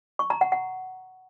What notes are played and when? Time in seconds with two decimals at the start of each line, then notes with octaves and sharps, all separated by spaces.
0.19 C#6
0.30 A#5
0.41 F#5
0.52 F#5